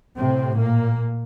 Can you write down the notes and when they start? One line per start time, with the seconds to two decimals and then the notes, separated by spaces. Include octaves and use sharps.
0.16 A2 C3 C4
0.59 A#2 A#3